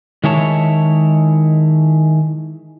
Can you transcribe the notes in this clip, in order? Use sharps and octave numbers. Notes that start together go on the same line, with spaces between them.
D#3 G#3 E4 C#5 A5